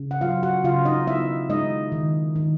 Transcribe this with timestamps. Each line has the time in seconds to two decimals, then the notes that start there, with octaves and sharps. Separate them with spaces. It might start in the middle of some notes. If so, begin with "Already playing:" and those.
Already playing: C#3
0.11 F#5
0.21 F#3 F4 F5
0.43 F#4 F#5
0.64 C#3 F4 F5
0.85 D#4 D#5
1.07 B3 E4 E5
1.50 G#3 D#4 D#5
1.92 D#3
2.36 D#3